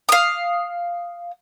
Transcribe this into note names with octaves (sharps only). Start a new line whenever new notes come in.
F5 D#6